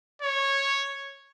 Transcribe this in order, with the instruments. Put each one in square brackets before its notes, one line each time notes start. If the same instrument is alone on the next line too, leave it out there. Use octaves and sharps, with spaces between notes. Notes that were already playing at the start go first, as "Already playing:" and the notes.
[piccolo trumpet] C#5